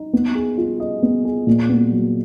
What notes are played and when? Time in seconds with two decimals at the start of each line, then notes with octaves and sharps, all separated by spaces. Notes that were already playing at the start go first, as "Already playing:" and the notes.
Already playing: D#4
0.13 B3
0.35 G#4
0.57 F4
0.80 D#5
1.03 B3
1.25 G#4
1.47 A#2
1.69 B3
1.92 F#3